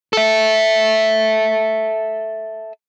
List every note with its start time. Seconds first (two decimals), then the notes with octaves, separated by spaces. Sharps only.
0.13 A4 E5